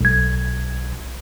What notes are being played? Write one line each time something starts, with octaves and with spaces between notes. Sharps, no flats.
B1 G#6